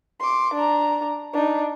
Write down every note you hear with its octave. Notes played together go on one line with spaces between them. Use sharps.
C6 D6
D4 A#5
D4 D#4